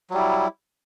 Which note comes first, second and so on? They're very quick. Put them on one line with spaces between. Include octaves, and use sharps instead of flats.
F#3 G3 E4